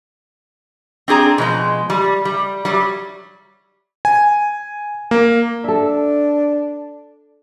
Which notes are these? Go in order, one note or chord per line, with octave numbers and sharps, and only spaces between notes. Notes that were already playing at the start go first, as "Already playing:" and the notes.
C4 D4 G#4 A#5
B2 F3 G#3
G3
G3
F#3 G3
G#5
A#3
D4 A4 E5